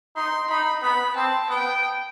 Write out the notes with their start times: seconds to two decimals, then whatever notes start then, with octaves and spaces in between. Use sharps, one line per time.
0.16 D#4 C6
0.49 D#4 B5
0.82 B3 B5
1.15 C4 A5
1.49 B3 G5